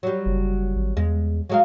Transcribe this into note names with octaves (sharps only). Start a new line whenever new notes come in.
F#3 G3
F#1
G#1
E2 G#3
F#3 G#3 F5